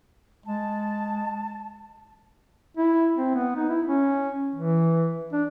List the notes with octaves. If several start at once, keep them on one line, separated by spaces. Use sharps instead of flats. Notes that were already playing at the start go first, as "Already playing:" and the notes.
G#3 A5
E4
C4
B3
D#4
E4
C#4
E3
D4